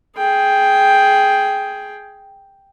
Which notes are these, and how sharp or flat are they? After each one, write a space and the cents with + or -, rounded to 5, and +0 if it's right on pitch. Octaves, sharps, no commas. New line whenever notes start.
G#4 +10 G5 +0